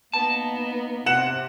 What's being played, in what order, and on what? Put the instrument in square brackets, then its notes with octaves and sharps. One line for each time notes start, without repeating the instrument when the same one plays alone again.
[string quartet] A#3 B3 D#4 [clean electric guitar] A5
[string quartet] C3 [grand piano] F#5 E7